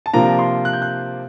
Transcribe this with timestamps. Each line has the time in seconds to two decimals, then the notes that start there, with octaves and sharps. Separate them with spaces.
0.06 A5
0.13 C3 F3 A#3 D4 F4 A#5
0.39 C6
0.65 F#6
0.73 G6
0.82 F#6